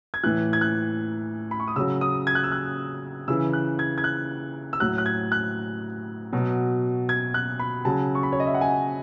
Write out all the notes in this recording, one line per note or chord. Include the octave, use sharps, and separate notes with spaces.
G#6
A2 E3 F#6
G#6
F#6
B5
C#6
D#6
C#3 F#3 E6
D#6
G#6
F#6
E6
F#6
C#3 E3 E6
F#6
G#6
G#6
F#6
E6
A2 F#3 F#6
F#6
G#6
F#6
B2 F#3
G#6
F#6
B5
C#3 F#3 A5
C#6
B5
C#5
D#5
E5
F#5
G#5